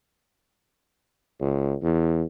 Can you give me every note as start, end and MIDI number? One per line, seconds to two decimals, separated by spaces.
1.41 1.74 37
1.82 2.23 40